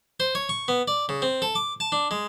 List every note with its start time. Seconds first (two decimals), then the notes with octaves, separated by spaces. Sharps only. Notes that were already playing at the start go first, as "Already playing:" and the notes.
0.20 C5
0.35 C#5
0.49 C#6
0.68 B3
0.88 D5
1.09 C#3
1.22 C4
1.42 A4
1.55 D6
1.80 A5
1.92 D4
2.11 G#3